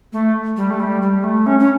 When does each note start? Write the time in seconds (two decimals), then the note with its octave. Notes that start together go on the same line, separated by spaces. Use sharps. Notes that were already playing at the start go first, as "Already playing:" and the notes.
0.13 A3
0.57 G3
0.70 A3
0.80 G3
1.02 G3
1.24 A3
1.46 C#4
1.59 C#4